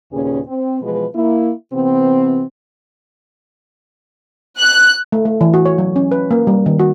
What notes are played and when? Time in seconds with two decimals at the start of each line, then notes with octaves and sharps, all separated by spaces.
0.12 D#2 A#2 C#3 C#4 G#4 B4
0.47 C4
0.81 B2 E3 F3 G#3 B4
1.14 A#3 E4
1.73 C3 E3 B3 C4
4.60 F#6
5.12 A3
5.25 A3
5.41 E3
5.54 F#4
5.65 C#5
5.78 F#3
5.96 C#4
6.12 B4
6.31 A#3
6.47 G3
6.66 D#3
6.79 F#4